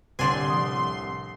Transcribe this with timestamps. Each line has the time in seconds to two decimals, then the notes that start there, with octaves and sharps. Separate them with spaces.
0.19 C2 A2 D3 D4 G#5 C6
0.50 F3